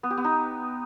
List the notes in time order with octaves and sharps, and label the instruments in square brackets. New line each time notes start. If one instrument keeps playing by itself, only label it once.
[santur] B3
G4
B3
D#4